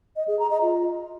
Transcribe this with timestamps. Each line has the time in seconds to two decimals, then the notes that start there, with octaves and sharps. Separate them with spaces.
0.16 D#5
0.28 G#4
0.39 A#5
0.50 D#5
0.62 F4